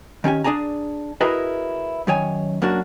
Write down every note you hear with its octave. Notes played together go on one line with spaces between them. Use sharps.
D#3 C#4 G4 G#5
D4 G#4 D5 G#5 A#5
E4 F#4 G#4 A#4 B4 D#5
F#2 D#3 C#5 G#5
F#2 A#3 D4 F#4